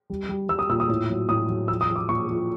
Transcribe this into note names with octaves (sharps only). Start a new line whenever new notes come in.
G3
G3
G3 E6
D#6
A#2 E6
D#6
A2
F#3
A2 D#6
F#3
F3 E6
D#6
F3
D6
A#2 C#6
F3